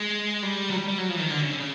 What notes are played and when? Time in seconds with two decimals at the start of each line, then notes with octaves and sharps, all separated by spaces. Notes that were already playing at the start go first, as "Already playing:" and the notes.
Already playing: G#3
0.43 G3
0.69 F#3
0.76 G3
0.87 G3
0.98 F#3
1.09 F3
1.16 E3
1.20 D#3
1.31 D3
1.42 C#3
1.51 D3
1.59 C#3